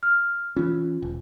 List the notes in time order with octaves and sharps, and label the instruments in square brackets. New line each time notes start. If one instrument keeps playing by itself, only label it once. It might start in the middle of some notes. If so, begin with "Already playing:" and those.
[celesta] F6
[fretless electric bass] E3 C#4 [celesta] F4
[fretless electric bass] E1